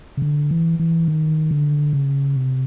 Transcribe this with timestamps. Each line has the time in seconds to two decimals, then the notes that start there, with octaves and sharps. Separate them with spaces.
0.17 C#3
0.22 D3
0.51 E3
0.79 E3
1.08 D#3
1.51 D3
1.93 C#3
2.36 C3